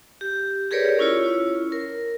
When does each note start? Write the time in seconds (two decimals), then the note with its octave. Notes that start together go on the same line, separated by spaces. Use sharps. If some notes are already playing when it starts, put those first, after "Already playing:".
0.21 G4
0.71 G4 G#4 A#4 B4 C#5 D5
0.99 C#4 E4 F4 C#5
1.72 A#4